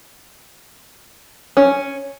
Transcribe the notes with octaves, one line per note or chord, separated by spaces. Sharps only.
C#4